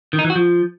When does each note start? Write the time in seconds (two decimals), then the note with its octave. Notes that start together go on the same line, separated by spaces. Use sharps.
0.13 D#3
0.19 D#4
0.24 E3
0.30 F#4
0.35 F3